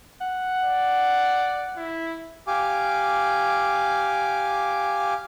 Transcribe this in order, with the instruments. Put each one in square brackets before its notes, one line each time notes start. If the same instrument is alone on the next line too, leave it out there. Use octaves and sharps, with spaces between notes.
[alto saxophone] F#5
[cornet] D5
E4
[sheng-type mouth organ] G4 F5 G#5 D6